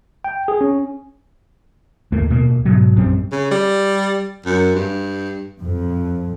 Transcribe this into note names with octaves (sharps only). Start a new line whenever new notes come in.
G5
G#4
C#4
G1 D#2 A3 A#3
D1 B2 A#3
G#2 B2 F#3
A#1 F#2 G3 C4
C#3
G3
F#2
G2
F2